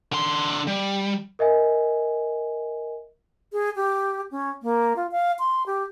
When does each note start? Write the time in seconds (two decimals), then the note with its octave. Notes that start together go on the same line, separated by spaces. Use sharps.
0.12 D3 C6
0.67 G3
1.39 A#4 D#5 E5 G#5
3.52 G#4
3.76 G4
4.31 C#4
4.62 A#3
4.96 F4
5.11 F5
5.39 C6
5.66 G4